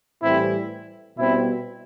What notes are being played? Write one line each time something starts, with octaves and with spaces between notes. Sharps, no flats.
A2 E3 G3 C4 E4
B2 G3 C4 E4